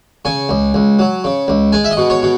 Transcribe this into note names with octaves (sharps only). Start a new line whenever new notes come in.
C#3 G#5
C#2
C#2
F#3
C#3
C#2
G#3 G#5
E5
D#5
B2
C#5
B2